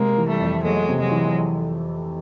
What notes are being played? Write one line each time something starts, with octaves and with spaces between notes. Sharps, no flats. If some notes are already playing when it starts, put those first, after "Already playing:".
Already playing: C3 G#3 A#3
E3
G3 A3
F2
F#3 G#3 A3
C3
F#3 G#3
E3